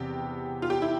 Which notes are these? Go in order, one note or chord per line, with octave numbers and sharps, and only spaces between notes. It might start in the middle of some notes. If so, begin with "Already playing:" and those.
Already playing: E2 C3 B3 G4
F4
G4
E4